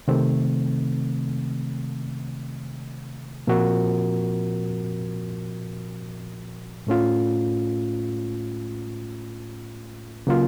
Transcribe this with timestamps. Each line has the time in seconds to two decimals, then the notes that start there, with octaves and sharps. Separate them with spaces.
0.08 C3 D#3 A3 C4
3.47 A#2 F3 C4 F#4 A#4
6.87 A2 A3 C#4 F4
10.27 C#3 F#3 A#3 F4